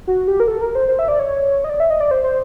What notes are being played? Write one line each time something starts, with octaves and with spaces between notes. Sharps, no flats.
F#4
G4
A#4
A4
A#4
C5
C5
E5
D5
C#5
D#5
D5
E5
D#5
D5
C5
C5